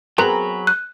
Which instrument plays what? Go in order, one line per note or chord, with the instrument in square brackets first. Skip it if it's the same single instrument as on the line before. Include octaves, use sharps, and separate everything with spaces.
[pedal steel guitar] F#3 A#5 B5 [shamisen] B3 C4 F#4 [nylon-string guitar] G#4 A#4
[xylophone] F#6